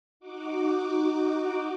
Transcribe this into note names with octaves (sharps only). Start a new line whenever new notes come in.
D#4 F#4 D6